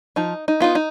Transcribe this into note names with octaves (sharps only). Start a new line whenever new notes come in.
F3 D#4
D#4
B3 D#4 F4
D#4